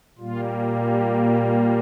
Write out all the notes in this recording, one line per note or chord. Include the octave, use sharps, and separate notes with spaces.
A#2 G3 A#3 F4
G4
G4